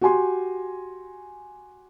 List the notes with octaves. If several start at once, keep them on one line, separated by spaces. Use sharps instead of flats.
F#4 G4 G#5 C6